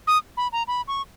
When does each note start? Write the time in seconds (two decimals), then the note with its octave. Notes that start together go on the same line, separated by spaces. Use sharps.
0.07 D#6
0.37 B5
0.52 A#5
0.67 B5
0.88 C#6